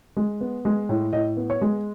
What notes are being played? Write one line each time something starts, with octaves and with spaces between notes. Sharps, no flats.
G#3
B3
G#3
A2
A2 D#5
B3
C#5
G#3